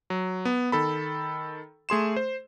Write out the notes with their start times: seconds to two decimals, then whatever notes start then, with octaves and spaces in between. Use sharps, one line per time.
0.10 F#3
0.45 B3
0.72 D#3 A4 B5
1.89 A3 G#4 C6 E7
2.16 C5